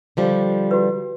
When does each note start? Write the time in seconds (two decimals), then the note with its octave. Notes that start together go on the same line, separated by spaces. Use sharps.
0.17 D3 F3 G3
0.71 F#4 B4